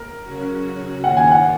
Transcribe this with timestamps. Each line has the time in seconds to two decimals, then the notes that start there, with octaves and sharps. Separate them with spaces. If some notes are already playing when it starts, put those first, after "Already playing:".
Already playing: A#4
0.22 C#3 F#3 C#4 F#4
1.04 D#3 A#3 F4 F#5
1.17 G#5
1.31 F#5